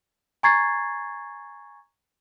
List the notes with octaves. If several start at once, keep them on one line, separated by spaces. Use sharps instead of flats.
G#5 A#5 C#6 G#6 A6 C7